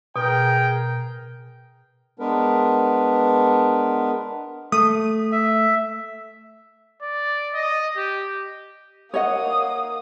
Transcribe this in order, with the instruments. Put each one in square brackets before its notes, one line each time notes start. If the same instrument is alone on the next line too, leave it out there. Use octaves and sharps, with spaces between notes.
[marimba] B2 [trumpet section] G#4 A#4 G5
[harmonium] G#3 B3 D4 A#4 B4
[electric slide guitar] A3 [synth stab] D#6
[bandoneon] E5
[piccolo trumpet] D5
D#5
G4
[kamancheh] A#3 D#6 [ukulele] C#5 D#5 F#5